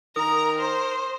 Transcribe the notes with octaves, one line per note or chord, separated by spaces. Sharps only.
D#3 A#4 A#5 D#6
C5